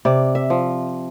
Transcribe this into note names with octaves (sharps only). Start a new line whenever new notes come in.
C3 D5
E5
F3